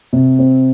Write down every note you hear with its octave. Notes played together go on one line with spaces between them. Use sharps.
C3
C4